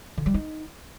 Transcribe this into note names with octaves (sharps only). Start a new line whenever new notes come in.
D3
G3
D#4